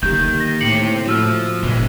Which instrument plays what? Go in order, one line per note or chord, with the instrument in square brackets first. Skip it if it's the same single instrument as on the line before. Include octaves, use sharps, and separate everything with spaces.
[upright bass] D3 A#3 [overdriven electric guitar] D#3 [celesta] G4 G6
[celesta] A#6
[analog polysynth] A2 [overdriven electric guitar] C4 G4 [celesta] C7 C#7 F#7
[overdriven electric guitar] F3 [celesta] F#4 E6 F6
[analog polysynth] G1 [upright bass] A#2 [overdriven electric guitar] E3 G#3